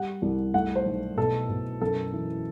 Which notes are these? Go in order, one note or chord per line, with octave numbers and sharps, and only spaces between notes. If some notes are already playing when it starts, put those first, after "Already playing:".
Already playing: G3 F#5
C2
A3 F#5
C5
B1
B2 A4
B2
F#2 A4
E3